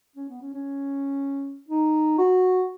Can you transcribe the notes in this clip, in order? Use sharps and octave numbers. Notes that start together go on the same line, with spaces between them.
C#4
B3
C#4
C#4
D#4
F#4